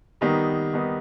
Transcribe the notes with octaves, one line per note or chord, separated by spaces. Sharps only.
D#3 G3 B3 D#4
D#3 G3 B3 D#4